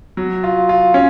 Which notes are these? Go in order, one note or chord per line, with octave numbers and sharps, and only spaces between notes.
F#3
F4
F4
C#4